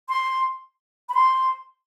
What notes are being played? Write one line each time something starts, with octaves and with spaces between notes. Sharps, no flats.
C6
B5
C6